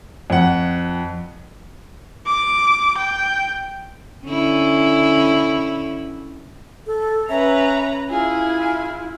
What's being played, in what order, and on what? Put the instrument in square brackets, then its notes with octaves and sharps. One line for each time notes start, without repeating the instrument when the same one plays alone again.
[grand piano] F2 F#5
[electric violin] D6
G5
[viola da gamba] D3 C#4 E4
[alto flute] A4
[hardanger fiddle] C#4 [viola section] B4 A#5 [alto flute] E5
[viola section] E4 [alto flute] F4 [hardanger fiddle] G#4 G#5